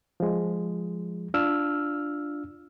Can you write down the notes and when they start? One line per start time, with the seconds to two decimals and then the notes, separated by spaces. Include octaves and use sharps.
0.20 F3 G#3
1.34 D4 F4 E6 F6